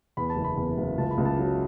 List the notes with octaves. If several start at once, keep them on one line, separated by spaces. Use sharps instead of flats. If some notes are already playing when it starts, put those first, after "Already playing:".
E2 B5
A5
F#1
B5
E2
F#1
C#2 A5
B5
C#2
A5
F#3 A5